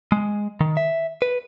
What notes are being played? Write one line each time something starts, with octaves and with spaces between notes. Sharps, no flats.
G#3
D#3
E5
B4